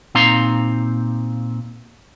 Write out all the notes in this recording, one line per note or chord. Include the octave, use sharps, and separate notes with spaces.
A#2 C4 D#4 F5 A#5 C6